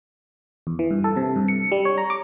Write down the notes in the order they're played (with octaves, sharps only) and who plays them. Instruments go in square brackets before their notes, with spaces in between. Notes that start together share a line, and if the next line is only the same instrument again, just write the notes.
[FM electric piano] E2
E3
G2
A4
C3
G2
C#7
G3
C#5
A#5
D6